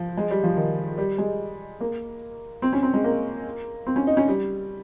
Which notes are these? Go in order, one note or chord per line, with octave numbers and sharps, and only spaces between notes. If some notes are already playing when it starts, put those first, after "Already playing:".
Already playing: F3
G#3
G3
F3
D#3
G3
G#3
A#3
C4
C#4
C4
G#3
A#3
C4
C#4
D#4
C#4
G3